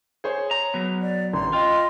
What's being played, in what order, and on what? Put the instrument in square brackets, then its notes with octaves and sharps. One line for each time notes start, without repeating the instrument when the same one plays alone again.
[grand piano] G#4 C5 C#5
[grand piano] C#5 [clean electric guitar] A#5
[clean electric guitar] F#3 B3
[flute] D5
[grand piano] A1 [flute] A#5 [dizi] C6
[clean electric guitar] F4 [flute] D#5 [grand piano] G5